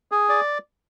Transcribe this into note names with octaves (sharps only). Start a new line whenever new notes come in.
G#4
D5